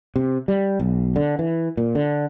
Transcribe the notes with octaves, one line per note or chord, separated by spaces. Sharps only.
C3
G3
B1
D3
E3
A#2
D3